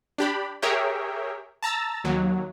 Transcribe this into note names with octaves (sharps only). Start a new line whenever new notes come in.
D4 G4 B5
G4 G#4 A#4 C#5 E5 G5
A5 A#5 E6 A6
D#2 F#3